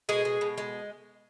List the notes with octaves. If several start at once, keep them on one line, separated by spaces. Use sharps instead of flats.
B2 G#3 G#4
G#3
B2
G#3